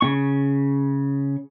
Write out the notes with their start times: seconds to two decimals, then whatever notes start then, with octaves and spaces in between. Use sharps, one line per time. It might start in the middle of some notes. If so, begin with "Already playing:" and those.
0.01 C#3 C#4 C#6